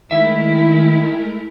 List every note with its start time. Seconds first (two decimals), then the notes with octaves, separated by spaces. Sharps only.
0.11 D#3 G#3 A3 E4 A#4 E5